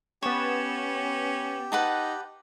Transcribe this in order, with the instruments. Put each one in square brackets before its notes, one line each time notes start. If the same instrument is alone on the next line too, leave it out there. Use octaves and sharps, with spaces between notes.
[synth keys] B3 A6 E7 [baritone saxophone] C#4 [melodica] G4 [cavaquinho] C#5
[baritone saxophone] D#4 [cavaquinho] B4 F#5 A5